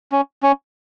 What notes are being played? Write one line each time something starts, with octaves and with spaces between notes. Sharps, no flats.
C#4
C#4